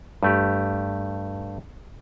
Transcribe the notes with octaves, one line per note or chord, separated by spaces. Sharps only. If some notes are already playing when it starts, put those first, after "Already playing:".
G2 A3 G4